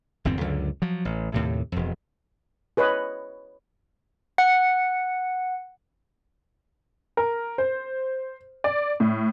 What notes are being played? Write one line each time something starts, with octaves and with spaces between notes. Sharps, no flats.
G1 E2 G#2 C4
C#2 F#2 D3
F3 F#3
A1
D#2 A2 C3
E1 F2
G#4 B4 C#5 D#5
F#5
A#4
C5
D5
A2